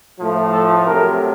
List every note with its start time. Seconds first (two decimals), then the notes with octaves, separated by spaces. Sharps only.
0.19 A2 F3 A3
0.53 A4
0.87 C3 F#3 A3 A#4